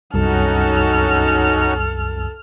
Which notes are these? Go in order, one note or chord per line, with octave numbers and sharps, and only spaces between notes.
C2 F#2 C#4 D#4 F#4 A4 F6